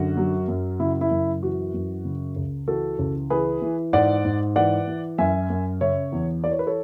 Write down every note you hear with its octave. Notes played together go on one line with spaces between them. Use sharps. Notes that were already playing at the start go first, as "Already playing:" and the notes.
Already playing: F#2 D3 F#4
F#3
F#2
C#3 E4
E4
F#2
E3 F#4
F#2
C#3
C#2
E3 F#4 A4
C#2
E3 G#4 B4
E3
G#2 D5 F#5
G#2
E3 D5 F#5
E3
F#2 E5 G#5
F#2
C#3 C#5 E5
E2
E3 D5
C#5
B4
A4 C#5